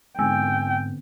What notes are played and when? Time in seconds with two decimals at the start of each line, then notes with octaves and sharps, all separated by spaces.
0.19 G#2 D3 B3 C4 G5 G#5 E6